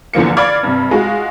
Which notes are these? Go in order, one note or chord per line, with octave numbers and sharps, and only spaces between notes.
E2 D3 F3 A#3 C#7
D5 F5 B5 D6 F6 G#6
G2 C3
G#3 F4 F#4